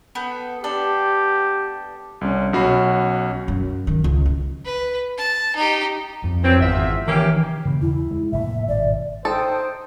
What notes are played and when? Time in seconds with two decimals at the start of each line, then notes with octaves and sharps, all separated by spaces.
0.15 B3 A4 G5
0.64 B3 D4 G4 A4
2.21 C2 C#4
2.53 B1 C#4 F#4 F#5 B5 C7
3.48 F#2
3.87 D#3
4.04 C#2
4.26 E4
4.65 B4
5.18 A5
5.56 D#4 G4
6.24 F2
6.43 E3 F#3 C4
6.61 G#1 E2 F4 E5
7.07 D#3 E3 A#3 C#4 G4
7.65 C#3 E3 A#3
7.82 E2 C#3 E4
8.11 G#3
8.32 F1 A2 A#3 E5
8.68 G#1 B2 D5
9.25 D#4 A4 C5 G5 A5 D#6